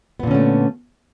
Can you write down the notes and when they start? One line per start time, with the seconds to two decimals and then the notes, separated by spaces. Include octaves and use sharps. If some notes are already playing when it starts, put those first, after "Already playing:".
0.20 B3
0.23 A#2
0.27 D3
0.31 C#4
0.35 A3